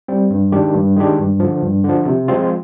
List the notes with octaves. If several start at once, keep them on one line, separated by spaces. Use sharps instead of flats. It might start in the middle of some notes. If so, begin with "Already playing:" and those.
G3 C4
G2
D#3 G#3 D4 G4
G2
D#3 G#3 D4 G4
G2
D3 F3
G2
D3
F3
C3
F3 G#3 C4 F4